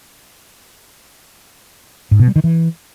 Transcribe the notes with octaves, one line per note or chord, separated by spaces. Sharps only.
G#2
B2
G3
D#3
E3